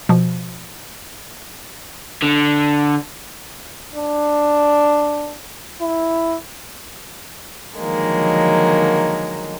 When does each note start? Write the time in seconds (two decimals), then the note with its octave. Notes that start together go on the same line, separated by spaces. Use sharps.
0.09 B2 F3
2.22 D3
3.95 D4
5.81 E4
7.78 D3 D#3 F3 F#3 G#3 A#3